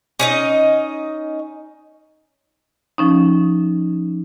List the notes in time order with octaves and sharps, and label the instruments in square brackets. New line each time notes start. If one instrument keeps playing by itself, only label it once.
[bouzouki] C#4 D#4 D#5
[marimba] F3 C#4 D#4